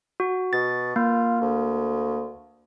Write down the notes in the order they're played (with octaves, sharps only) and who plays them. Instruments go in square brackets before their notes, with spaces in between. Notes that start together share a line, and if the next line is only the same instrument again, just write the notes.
[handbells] F#4
[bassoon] B2 [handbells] A6
[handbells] A#3 [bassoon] F4
[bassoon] D2